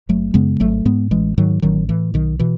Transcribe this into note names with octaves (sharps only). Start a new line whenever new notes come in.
F#1 F#3 A3
F#2 C#3 G#3 B3
G#1 F#3 A3
G#2 G#3 B3
A1 E3 G#3
G#2 D#3 F#3
A1 D#3 F#3
A2 E3
B1 D#3
B2 E3